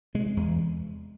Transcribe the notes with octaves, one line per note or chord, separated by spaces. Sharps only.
C3 G#3
E2